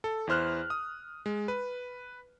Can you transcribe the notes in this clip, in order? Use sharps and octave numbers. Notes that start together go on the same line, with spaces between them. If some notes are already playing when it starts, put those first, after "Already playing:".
A4
E2 E4 C5 F6 F#6
D#6
G#3
B4